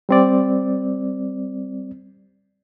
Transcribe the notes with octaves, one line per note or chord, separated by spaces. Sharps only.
G3 C4 D5